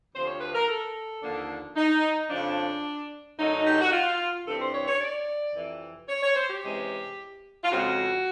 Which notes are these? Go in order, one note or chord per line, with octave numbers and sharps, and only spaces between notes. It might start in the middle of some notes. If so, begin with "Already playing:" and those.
D2 C3 F3 C5
C#5
B4
A#4
A4
D#2 D3 F3 A#3 D4
D#4
F2 C#3 F3 D4
F#2 D3 F#3 A3 D#4
G4
F#4
F4
G2 E3 G3 C4 A4
C5
C#5
C#5
D5
F2 C3 E3
C#5
C#5
C5
G4
C3 E3 G#3 C#4
F4
F2 C#3 F3 G#3 C4 F#4